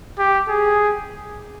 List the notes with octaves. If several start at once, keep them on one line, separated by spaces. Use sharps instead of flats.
G4
G#4